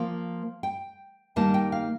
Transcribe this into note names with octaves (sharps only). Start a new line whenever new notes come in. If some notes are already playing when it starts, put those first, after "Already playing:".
Already playing: F3 A#3 F4 F5
G5
D#3 G3 A#3 D#4 A5
G5
F5